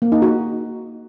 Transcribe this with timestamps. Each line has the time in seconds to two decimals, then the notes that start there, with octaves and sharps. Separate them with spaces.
0.02 A#3
0.12 D#4
0.22 F#4